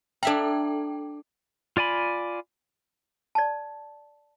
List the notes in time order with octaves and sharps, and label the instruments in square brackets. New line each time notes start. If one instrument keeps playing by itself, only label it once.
[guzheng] D4 E5 A#5 [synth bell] A4 G5
[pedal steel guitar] F4 D5 G#5 B5
[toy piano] D5 A5